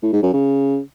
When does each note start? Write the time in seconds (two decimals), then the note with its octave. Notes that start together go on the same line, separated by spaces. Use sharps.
0.03 A2
0.13 G#2
0.23 F#2
0.33 C#3